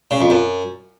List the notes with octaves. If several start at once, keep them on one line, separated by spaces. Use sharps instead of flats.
C#3
F2
F#2